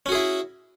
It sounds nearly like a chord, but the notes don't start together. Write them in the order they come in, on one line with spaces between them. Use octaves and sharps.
C#4 F#4 G#4 E4